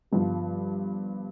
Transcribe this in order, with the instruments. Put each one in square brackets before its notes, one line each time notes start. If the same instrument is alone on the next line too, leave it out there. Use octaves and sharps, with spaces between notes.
[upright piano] G1 G2 F3